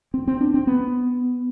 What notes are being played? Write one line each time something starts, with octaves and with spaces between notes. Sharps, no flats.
C4
C4
D4
C4
B3